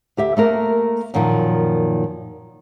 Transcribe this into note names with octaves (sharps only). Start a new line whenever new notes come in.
D2 G4 E5
A3 A#3 A#4
F#2 A#2 D#3 F3